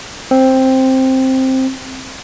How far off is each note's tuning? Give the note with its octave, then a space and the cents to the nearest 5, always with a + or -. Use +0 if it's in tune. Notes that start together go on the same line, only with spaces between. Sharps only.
C4 +5